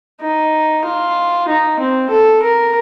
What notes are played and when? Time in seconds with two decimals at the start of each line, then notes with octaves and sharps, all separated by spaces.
0.22 D#4
0.85 F4
1.48 D#4
1.79 C4
2.11 A4
2.42 A#4